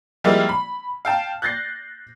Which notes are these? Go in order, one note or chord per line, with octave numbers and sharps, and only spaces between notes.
F3 G3 G#3 A#3 E4 F4
B5
F5 G5 A5
F#6 G6 A6 A#6 C7